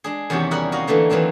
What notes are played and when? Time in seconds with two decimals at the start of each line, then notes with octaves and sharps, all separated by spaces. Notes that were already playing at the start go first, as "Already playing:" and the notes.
0.04 G#3 D4 G#4
0.30 E2 C3 D#3 C#4 F#4 G4
0.51 G3 G#4 A#4 F#5
0.72 F#4 D#5 F5
0.87 D3 E3 A3 A#3
1.10 D#3 E3 F#3 C4 D4